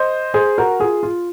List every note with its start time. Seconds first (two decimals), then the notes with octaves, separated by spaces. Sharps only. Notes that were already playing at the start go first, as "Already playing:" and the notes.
Already playing: C5 D#5
0.34 G#4 C5
0.58 F#4 A#4
0.80 F4 G#4
1.03 F4